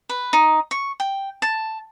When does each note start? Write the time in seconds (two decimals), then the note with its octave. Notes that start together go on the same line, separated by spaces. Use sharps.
0.09 B4
0.33 D#4
0.71 C#6
1.00 G5
1.42 A5